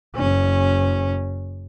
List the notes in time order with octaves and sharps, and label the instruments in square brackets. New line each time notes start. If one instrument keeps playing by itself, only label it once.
[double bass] F#1 C#4